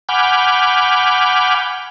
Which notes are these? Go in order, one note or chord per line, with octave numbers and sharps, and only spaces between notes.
F#5 G#5 B5 D6 F6 G6